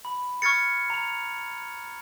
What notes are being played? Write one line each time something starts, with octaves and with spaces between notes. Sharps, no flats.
B5
C#6 F6 G#6 A6 C#7
A#5 F7